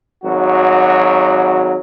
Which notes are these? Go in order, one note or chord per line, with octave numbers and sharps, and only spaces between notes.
G#1 F#3 F#4